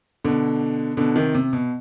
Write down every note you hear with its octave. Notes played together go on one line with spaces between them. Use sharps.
B2 D3
B2 D3
C3 D#3
C3
B2